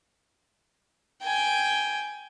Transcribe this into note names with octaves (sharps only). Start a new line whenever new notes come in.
G5 G#5